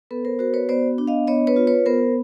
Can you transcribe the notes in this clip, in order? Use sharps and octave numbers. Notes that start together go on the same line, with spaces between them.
B3 A4 B4
A#4 C5
F#4 A#4 C5
B4 C#5
B3 C5 D5
D4
D#5 F5
B3 C#5 D#5
B4 C#5
F4
B4 C#5
B3 A#4 C5